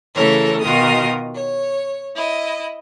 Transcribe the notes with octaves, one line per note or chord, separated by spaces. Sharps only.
C#3 E3 A3 A4 A#4 C#5
B2 D#3 F4 F#4 A#4 D#6
C#5
E4 D#5